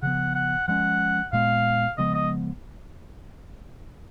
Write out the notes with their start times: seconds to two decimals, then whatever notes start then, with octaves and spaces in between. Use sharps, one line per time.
0.03 C#3 F3 B3 F#5
0.35 F#5
0.68 F3 G#3 C#4 F#5
1.33 A#2 G#3 B3 F5
1.98 C#3 F3 G#3 B3 D#5
2.14 D#5